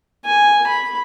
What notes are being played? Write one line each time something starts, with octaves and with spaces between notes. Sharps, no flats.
G#5
B5